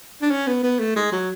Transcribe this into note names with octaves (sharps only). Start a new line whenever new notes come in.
D4
C#4
B3
B3
A3
G#3
F#3